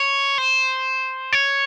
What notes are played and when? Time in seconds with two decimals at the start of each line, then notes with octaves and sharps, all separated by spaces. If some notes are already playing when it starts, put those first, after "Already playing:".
Already playing: C#5
0.38 C5
1.33 C#5